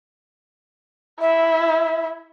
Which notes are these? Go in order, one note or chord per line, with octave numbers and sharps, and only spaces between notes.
E4 E5